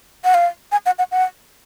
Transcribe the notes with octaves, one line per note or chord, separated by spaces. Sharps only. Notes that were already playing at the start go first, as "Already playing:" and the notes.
F#5
F5
G#5
F#5
F#5
F#5